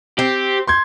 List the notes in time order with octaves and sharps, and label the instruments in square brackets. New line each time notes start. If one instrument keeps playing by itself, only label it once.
[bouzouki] C4 [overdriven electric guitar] G4
[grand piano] C6 G6 G#6